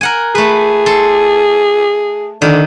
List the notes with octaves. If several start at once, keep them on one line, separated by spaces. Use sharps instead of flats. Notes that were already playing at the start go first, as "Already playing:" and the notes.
A#4 F#5 G#5
A3 G#4 B4
A4 C6
D3 D#3